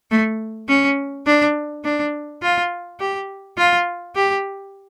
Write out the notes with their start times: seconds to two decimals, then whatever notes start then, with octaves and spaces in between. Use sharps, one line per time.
0.11 A3
0.69 C#4
1.27 D4
1.84 D4
2.42 F4
3.00 G4
3.58 F4
4.16 G4